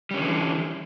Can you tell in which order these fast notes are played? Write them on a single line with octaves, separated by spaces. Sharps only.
G3 C#4 D3 E3